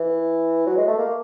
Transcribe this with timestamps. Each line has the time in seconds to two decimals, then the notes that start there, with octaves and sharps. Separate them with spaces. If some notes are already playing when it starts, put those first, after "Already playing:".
Already playing: E3
0.67 F#3
0.77 G#3
0.88 A3
0.99 A#3